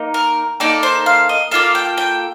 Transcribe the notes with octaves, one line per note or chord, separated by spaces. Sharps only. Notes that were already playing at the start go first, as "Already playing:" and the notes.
Already playing: A#3 D#4
A#4
A#3 D#4 A4 D5
C5
F5
D#5
A#3 F4 A4 F5
G5
G5